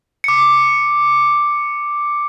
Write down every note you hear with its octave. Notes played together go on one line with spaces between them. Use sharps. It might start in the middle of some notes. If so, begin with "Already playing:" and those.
D6 C#7